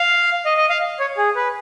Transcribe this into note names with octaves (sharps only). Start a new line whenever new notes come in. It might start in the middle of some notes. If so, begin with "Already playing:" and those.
Already playing: F5
D#5
D#5
F5
C#5
G#4
B4